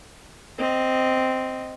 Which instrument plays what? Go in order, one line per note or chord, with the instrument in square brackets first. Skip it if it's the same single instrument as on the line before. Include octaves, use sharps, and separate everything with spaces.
[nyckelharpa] C4 D#5